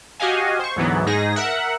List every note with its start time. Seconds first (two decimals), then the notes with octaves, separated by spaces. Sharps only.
0.20 F#4 G4 D#5 F5 G#5
0.59 C5 C#6
0.76 D2 G#2 E3 F#3 B3
1.07 G#2 D#4 G#4 A#6
1.36 A#4 E5 F#5